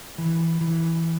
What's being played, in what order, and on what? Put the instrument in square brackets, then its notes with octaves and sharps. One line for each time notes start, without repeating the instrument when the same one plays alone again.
[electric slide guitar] E3
E3